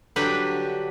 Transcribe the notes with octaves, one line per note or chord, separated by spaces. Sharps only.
D3 F#3 G3 D4 G4 B4